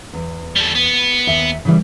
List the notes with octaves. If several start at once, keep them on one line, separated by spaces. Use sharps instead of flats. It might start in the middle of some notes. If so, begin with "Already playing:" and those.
E2
G3 A4
B3
D#2 E5
C#3 E3 G3